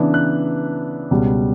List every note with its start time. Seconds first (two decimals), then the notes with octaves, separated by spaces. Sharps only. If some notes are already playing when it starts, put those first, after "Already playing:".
Already playing: C#3 E3 B3 D4
0.14 F#6
1.11 C#2 B2 G3